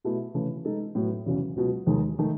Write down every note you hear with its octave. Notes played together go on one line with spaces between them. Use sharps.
B2 A3 E4
C#3 E3 A3
G#3 D#4 A4
A2 F#3 B3
E2 C#3 F#3 C#4
C#2 B2 F#3
D#2 D#3 G#3
D#3 A3